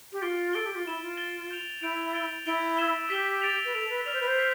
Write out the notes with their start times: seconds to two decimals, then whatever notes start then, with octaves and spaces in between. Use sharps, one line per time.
0.13 G4
0.21 F4 A6 D7 G7
0.53 A4 A6 D7 G7
0.66 G4
0.75 F4
0.86 E4 A6 E7 G7
1.02 F4
1.17 A6 E7 G7
1.50 G6 D7 F7
1.81 E4 G6 D7 F7
2.13 A6 D7 G7
2.46 E4 A6 D7 G7
2.77 E6 B6 E7 G7
3.09 G4 E6 B6 E7 G7
3.42 A6 D7 F7
3.65 B4
3.73 A4 A6 D7 F7
3.90 B4
4.05 D5 F6 B6 F7
4.13 C5
4.21 B4
4.27 C5
4.38 F6 B6 F7